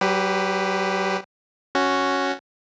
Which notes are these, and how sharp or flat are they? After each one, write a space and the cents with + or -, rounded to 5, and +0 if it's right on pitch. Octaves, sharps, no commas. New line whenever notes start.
F#3 +45 G4 +15 B4 +15
C#4 +0 F#4 +0